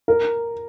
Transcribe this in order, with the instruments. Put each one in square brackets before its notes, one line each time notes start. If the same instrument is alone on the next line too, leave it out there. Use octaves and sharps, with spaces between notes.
[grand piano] A#4